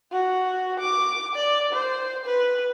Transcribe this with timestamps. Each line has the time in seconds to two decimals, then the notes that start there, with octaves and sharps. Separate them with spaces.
0.12 F#4
0.80 D6
1.36 D5
1.73 C5
2.26 B4